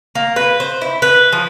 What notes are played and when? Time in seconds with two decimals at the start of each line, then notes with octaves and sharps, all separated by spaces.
0.15 A#3
0.36 B4
0.60 C5
0.81 E4
1.02 B4
1.32 F3